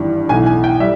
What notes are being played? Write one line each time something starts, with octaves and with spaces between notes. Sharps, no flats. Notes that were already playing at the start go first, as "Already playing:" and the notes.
Already playing: G#1 G2 E3 G3
B1 A2 E3 G#5
G#5
G5
G3 E5